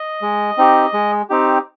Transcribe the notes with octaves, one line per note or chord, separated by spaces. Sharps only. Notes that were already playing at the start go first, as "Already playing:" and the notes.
Already playing: D#5
G#3
C4 D#4 G4
G#3
C4 D#4 G4